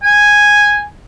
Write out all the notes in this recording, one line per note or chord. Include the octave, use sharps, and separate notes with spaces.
G#5